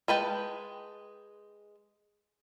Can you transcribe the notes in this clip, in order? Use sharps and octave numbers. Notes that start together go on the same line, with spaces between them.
G#3 B4 G5 A5